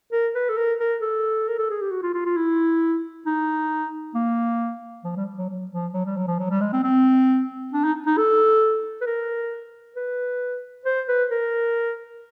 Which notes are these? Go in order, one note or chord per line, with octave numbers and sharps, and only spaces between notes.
A#4
B4
A4
A#4
A#4
A4
A#4
A4
G#4
G4
F#4
F4
F4
F4
E4
D#4
A#3
F3
G3
F#3
F#3
F3
F#3
G3
F#3
F3
F#3
G3
G#3
C4
C4
D4
D#4
D#4
A4
B4
A#4
B4
C5
B4
A#4